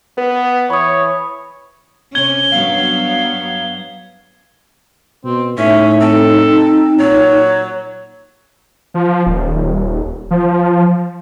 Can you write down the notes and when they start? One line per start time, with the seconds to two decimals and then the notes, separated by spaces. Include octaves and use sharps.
0.18 B3 B4
0.70 E3 C#5 B5 D#6
2.15 C3 C#4 G#6 G7
2.52 G2 F#3 B3 F5
5.25 B2 C4
5.58 A2 C#4 D#4 E5
6.00 C4 A4
6.98 A#2 F#3 C#5
8.94 F3
9.26 D#1
10.31 F3